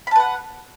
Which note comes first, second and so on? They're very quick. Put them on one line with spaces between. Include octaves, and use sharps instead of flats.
B5 A5 B4 F#5